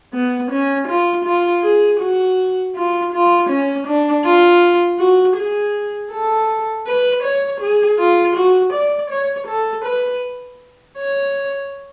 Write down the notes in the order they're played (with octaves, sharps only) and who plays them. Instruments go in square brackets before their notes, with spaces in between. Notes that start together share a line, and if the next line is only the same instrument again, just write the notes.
[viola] B3
C#4
F4
F4
G#4
F#4
F4
F4
C#4
D4
F4
F#4
G#4
A4
B4
C#5
G#4
F4
F#4
D5
C#5
A4
B4
C#5